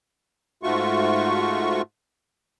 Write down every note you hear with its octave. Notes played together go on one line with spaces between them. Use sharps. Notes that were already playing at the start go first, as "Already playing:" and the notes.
G#2 A3 F4 F#4 C#6